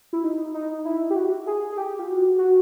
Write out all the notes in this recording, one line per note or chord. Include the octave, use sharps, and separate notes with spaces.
E4
D#4
D#4
E4
G4
F#4
G#4
G#4
G4
F4
F#4
F#4